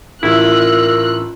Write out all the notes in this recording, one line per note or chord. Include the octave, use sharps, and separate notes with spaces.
A1 E4 F4 A#4 E6 F#6